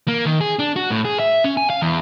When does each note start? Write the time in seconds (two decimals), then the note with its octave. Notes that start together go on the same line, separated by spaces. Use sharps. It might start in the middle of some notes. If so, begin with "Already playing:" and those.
0.08 A#3
0.26 D#3
0.41 G#4
0.59 D4
0.76 F#4
0.90 A2
1.05 G#4
1.20 E5
1.44 C#4
1.57 G#5
1.70 F5
1.82 E2